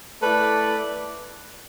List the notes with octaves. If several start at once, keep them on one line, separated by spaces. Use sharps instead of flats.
A3 E4 B4 D5